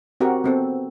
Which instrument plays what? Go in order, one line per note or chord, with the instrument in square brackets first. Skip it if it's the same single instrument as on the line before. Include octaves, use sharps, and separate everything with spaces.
[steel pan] C4 F#4 G4 A#4 F#5
B3 C4 A4